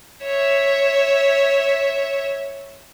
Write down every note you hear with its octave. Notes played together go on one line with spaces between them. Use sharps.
C#5 E5